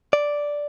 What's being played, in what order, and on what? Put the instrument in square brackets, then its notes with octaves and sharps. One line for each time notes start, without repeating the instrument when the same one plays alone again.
[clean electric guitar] D5